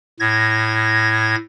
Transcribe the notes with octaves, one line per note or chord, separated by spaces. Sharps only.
A2 G#6 A#6